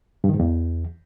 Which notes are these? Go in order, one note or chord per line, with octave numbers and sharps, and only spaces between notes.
G2
D#3
G#2
E2